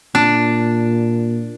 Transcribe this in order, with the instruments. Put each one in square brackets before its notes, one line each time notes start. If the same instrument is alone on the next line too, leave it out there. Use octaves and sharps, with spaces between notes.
[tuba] A#2 [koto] D4